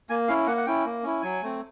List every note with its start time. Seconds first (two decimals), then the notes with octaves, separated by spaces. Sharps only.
0.10 A#3 G#5
0.28 C#4 E4 F5
0.47 A#3 F#5
0.57 F#5
0.66 C#4 E4 G5
0.85 A#3
1.03 C#4 E4
1.22 F#3 G#5
1.42 A3 C4